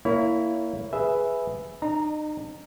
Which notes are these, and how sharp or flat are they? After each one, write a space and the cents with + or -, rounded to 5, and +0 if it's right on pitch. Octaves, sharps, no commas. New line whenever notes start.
A#3 +0 E4 +0 C#5 +30
G#4 +0 B4 +0 E5 +0
D#4 -35 A#5 +0